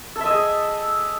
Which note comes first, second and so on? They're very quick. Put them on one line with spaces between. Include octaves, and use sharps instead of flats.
A4 E5 D#5 G#4